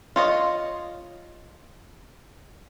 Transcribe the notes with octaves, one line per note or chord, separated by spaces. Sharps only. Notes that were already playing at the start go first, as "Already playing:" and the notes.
F4 C#5 D#5